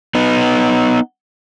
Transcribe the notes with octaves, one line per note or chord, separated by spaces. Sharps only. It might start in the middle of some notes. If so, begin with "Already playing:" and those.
B3 D#4